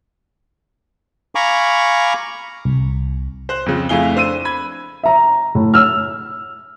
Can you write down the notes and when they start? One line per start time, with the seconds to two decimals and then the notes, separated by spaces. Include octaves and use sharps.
1.35 F5 G#5 A#5 B5 C#6 D6
2.65 C2
3.49 C5 F#6
3.66 F2 C#3
3.89 F2 A3 E4 G#4 F5 G7
4.15 D4 C5 E6 D#7
4.45 B5 G#6
5.03 E5 A#5
5.55 A2
5.74 E6 F6